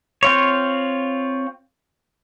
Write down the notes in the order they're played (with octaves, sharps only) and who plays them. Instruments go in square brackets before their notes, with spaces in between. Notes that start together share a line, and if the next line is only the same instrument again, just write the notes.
[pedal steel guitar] C4 F4 C#5